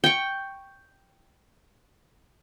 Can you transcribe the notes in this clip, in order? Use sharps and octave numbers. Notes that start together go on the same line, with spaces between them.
G5 C#6